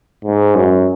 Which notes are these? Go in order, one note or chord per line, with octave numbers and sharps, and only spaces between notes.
G#2
F#2